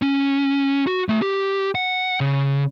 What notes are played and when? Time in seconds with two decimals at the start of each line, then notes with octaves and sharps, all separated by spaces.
0.02 C#4
0.87 F#4
1.09 A3 G#5
1.22 G4
1.75 F#5
2.20 C#3